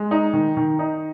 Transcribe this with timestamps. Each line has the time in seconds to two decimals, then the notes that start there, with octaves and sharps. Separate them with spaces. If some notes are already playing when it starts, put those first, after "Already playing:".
Already playing: G#3
0.11 D#4
0.33 D#3
0.57 D#3
0.79 D#4